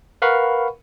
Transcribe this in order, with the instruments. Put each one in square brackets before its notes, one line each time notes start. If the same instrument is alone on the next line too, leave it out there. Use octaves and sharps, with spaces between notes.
[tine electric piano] A#4 B4 F5 F#5 B5 C#6